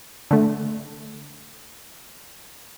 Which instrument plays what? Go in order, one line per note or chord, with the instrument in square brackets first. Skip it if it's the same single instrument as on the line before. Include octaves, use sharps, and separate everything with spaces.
[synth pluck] D3 A3